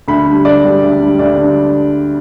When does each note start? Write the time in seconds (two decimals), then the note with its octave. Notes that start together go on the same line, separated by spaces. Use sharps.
0.08 D2 B5
0.26 D3 G3
0.45 D2 D5
0.64 D3 G3
0.82 D2
1.01 D3 G3
1.19 D2 D5
1.38 D3 G3